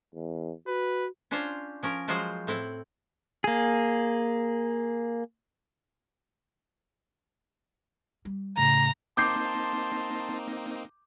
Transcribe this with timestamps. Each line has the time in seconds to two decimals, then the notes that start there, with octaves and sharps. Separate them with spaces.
0.15 E2
0.67 F#4 B4
1.31 C#4 D4 F4 C5 C#5
1.83 F3 C#4 A#4
2.08 F3 F#3 G#3 F4 F#4 C5
2.47 A2 C4 E4 F#5
3.44 A#3 G#4
8.25 G3
8.57 A2 C#3 A#5
9.17 A#3 C4 D#4 A5 C6 D6 G6 C7